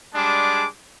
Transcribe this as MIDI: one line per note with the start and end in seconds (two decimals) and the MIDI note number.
0.15 0.67 55
0.15 0.67 56
0.15 0.67 62
0.15 0.67 68
0.15 0.67 81
0.15 0.67 86